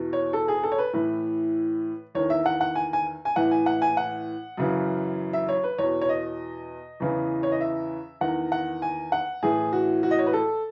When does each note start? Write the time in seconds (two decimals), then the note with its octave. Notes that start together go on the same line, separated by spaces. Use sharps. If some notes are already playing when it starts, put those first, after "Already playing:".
Already playing: E2 B2
0.13 C#5
0.33 A4
0.48 G#4
0.63 A4
0.72 C#5
0.78 B4
0.93 A2 E3 B4
2.15 E2 D#3 C#5
2.30 E5
2.46 F#5
2.61 F#5
2.75 G#5
2.93 G#5
3.25 G#5
3.36 A2 E3 F#5
3.51 G#5
3.66 F#5
3.82 G#5
3.97 F#5
4.57 F#2 C#3 E3
5.33 E5
5.49 C#5
5.64 B4
5.78 E2 B2 C#5
6.01 C#5
6.09 D#5
7.00 E2 C#3 E3
7.43 C#5
7.52 D#5
7.61 E5
8.21 E2 D#3 F#5
8.52 F#5
8.82 G#5
9.12 F#5
9.43 A2 E3 G#4
9.73 F#4
10.03 F#4
10.11 D#5
10.19 C#5
10.26 B4
10.33 A4